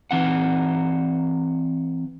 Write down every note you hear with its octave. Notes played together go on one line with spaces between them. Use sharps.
E3 C4 F#5